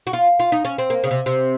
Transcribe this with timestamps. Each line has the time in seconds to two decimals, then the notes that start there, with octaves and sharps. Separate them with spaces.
0.07 F#4
0.13 F4
0.39 F4
0.52 D#4
0.65 C#4
0.78 C4
0.90 A#3
1.04 C#3
1.11 C3
1.26 C3